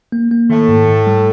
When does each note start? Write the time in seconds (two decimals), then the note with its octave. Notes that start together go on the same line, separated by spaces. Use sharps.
0.12 A#3
0.31 A#3
0.50 A2 D#3 A3
0.68 G#2
0.88 G#2
1.07 G3